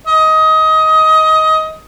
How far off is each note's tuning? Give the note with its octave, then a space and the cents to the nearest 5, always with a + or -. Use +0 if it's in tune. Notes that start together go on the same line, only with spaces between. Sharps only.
D#5 +20